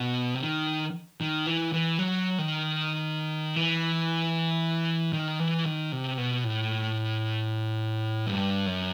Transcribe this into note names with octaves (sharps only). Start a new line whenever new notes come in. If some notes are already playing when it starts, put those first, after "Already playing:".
Already playing: B2
C3
D#3
D#3
E3
E3
F#3
D#3
E3
D#3
E3
D#3
C3
B2
A2
G2
F#2